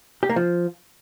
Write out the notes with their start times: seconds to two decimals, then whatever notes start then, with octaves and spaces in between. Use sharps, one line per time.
0.23 G4
0.30 A#3
0.36 F3